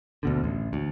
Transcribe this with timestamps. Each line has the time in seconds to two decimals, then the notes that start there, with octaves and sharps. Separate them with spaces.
0.23 D2 B2 D3
0.44 A1
0.73 D2